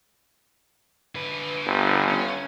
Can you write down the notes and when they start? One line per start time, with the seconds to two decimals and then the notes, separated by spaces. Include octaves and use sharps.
1.15 D3 B4
1.66 G1
2.08 C#4